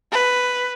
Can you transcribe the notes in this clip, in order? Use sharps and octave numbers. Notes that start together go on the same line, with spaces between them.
B4